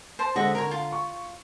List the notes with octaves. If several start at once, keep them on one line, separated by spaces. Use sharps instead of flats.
C5 A5
D3 G#3 F#4 C5 D#5 E5
D3 A#4 C#5 A#5
F4
C#6